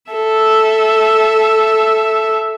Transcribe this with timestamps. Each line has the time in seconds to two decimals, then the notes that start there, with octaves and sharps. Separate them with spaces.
0.11 A4 E5